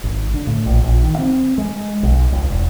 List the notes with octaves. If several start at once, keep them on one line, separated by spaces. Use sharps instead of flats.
G#1
D3
A2
A#1
A#1
D#3
C4
G#3
B1
C#2
E1